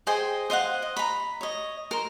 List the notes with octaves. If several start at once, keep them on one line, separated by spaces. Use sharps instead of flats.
G#4 C5 D#5 G5
C5 D#5 F5 F#5
D#5
A#5 B5
C#5 D#5
A#4 C5